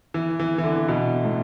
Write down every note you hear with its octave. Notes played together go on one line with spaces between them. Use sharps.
E3
E3
E3
D3
B2
A2